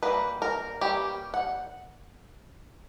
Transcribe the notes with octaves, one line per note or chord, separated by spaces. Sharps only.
E3 G3 A#3 B4
A#4
E3 G3 A#3 C#4 G4
F#5